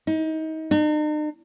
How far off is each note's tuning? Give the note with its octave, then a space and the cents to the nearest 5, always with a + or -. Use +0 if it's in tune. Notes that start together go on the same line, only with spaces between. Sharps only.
D#4 +30
D#4 -45